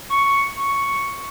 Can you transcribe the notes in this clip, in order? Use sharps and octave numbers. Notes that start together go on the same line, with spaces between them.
C#6
C#6